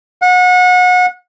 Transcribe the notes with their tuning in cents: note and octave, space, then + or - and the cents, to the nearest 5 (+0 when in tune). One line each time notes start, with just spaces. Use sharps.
F#5 -30